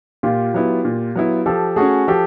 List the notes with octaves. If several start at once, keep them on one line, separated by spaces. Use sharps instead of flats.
A#2 F4 G4
F#3 B3 E4
A#2
F#3 B3 E4
F3 G4 A4
A3 C#4 F#4 G#4
F3 G4 A4